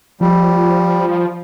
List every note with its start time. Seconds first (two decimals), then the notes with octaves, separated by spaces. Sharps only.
0.21 F3 G3